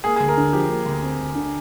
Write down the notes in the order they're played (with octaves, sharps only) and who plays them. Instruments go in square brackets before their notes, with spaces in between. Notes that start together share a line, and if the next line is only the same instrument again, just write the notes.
[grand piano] A#3 [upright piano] G#4
[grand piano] D2 [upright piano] G#4
[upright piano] A#4
[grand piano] D3
[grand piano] F3 [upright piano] G4
[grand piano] A#3
D2
C4
D2
D3